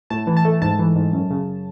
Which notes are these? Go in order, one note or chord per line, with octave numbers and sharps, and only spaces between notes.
A2 A5
E3
A5
A3
G#2 A5
E3
G#2
F#2
C#3